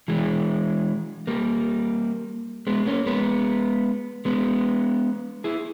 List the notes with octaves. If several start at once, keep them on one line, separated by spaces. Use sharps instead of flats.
E3 G#3
G3 A#3
G#3 B3
A#3 C#4
G#3 B3
G#3 B3
E4 G#4